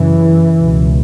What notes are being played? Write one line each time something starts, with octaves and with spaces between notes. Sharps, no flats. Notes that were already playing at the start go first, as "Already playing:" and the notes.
Already playing: F#2 C#3 E3
C#2 B2